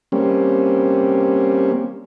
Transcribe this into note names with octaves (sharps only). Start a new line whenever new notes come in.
G3 A#3 C4 C#4